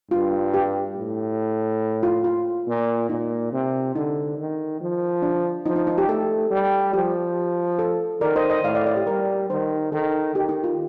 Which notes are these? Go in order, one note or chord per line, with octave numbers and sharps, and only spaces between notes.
G2 F4
G4
A2
F4
F4
A#2
A#2 D#4
C3
D3 D#4
D#3
F3
D4
F3 D#4
D#4
D#4
G4
A3 A4
G3
F3 G4
A4
D#3 A#4 D5
C5 D#5
C5 D#5
A2 D5 F5
D5 F5
D5 F5
G4
G3 A#4
D#3 C5
D#3 A4
D#3 G4
D#4
F4